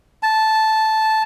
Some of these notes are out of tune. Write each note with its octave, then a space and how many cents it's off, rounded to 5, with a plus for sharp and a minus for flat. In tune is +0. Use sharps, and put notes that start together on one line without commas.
A5 -10